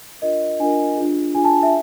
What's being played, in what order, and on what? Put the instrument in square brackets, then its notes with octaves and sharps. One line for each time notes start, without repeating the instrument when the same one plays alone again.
[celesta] D4 F4 A#4 D#5
D4 F4 A#4 G#5
D4 F4 G#4
D4 F4 G#4 G#5
A5
E5